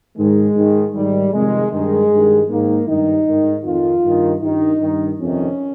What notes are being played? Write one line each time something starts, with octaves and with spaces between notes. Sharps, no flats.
G#2 D#3 G#3
G#2 D#3
G#2 D#3 G3
F2 C3 D#3 G#3
G2 D#3 G#3
G2 D#3
G#2 D#3 A#3
G2 D#3 D#4
G#2 D#3
F2 D#3 F4
G2 D#3
G2 D#3 D#4
G2 D#3
F2 C3 D#3 C#4